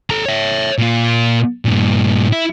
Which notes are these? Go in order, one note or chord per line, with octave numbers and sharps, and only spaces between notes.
A4 A#5
C#5 E5
A#2 F4
G2 A#2
E4